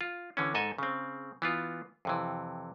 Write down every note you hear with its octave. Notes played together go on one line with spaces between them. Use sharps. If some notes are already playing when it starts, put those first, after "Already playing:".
F4
D3 E3 C#4
G#2 A4 D#5 G#5
C#3 C4
E3 B3 F4
F2 C3 E3